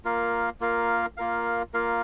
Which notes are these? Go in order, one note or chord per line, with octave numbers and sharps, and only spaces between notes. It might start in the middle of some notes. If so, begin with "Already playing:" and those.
A#3 F4 A#4 F5
A#3 F4 A#4 F5
A#3 F4 A#4 F5
A#3 F4 A#4 F5